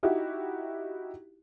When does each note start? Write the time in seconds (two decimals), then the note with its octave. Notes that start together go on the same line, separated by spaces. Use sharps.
0.03 D#4 E4 F#4 G4